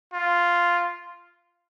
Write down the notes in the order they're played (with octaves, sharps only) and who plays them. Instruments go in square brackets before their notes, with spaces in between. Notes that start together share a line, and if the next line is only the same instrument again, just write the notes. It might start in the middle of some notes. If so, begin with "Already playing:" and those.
[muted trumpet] F4